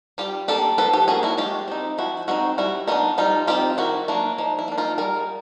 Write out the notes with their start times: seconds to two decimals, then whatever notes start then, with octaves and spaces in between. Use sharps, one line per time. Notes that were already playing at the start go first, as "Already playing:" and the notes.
0.18 G3 F4 G4
0.48 A#3 D4 G4 A4
0.78 F3 A4 B4
0.93 G4 A4
1.08 A#3 C#4 F#4 G#4
1.23 E4 F#4
1.38 G#3 F4 G4
1.68 C4 D#4
1.98 F3 E4 F#4
2.28 G#3 C4 D#4 E4 F#4
2.58 G3 E4 F#4
2.88 B3 D#4 F4
2.92 D4
3.18 G3 D#4 F4
3.47 C4 D#4 F4 G4
3.78 D#3 E4 F#4
4.08 F#3 A#3 D4 E4
4.38 F3 D#4
4.59 E4
4.68 A#3 D4
4.78 D#4 F4
4.98 G3 G#4 A#4